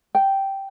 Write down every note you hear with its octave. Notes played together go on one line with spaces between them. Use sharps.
G5